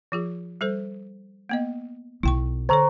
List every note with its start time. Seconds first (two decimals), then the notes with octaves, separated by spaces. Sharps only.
0.12 F3 F4 G#4
0.61 G3 A4 C5
1.49 A#3 B3 D#5
2.23 B1 E4 G5 C#6
2.69 D3 A4 C5 C#5 A#5 C#6